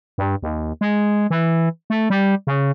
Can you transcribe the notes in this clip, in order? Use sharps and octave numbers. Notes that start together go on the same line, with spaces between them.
G2
D#2
G#3
E3
A3
G3
C#3